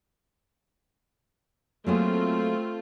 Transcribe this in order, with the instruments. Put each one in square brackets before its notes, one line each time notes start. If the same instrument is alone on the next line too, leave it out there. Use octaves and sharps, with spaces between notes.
[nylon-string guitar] F#3 A#3 G#4 [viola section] A3 C4 F4